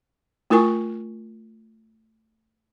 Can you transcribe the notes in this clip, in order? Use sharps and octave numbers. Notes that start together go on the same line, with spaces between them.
A3 E4 F4 A#4 G#5 C#6